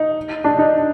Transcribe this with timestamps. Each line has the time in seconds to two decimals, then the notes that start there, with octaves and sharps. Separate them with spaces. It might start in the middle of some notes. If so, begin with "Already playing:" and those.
Already playing: D#4
0.44 D4
0.59 D#4